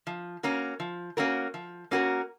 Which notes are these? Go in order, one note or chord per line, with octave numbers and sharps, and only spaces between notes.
F3
A#3 C#4 F#4 A#4
F3
A#3 C#4 F#4 A#4
F3
A#3 C#4 F#4 A#4